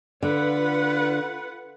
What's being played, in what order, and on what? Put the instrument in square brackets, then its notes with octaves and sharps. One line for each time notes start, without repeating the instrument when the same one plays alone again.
[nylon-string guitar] D3 [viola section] F4 B4 F#5